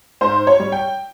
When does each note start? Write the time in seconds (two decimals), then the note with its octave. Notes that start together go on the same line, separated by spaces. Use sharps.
0.21 G#2 C5
0.47 C#5
0.59 G3
0.72 G5